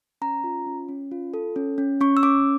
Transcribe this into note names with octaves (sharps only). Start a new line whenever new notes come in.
C#4 A#5
F4
C#4
C#4
F4
A4
C#4
C#4
C#4 C#6
E6
C#4 D6